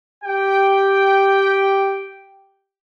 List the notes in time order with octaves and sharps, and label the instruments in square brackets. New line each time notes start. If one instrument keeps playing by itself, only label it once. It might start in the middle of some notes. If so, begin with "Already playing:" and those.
[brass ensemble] G4 G5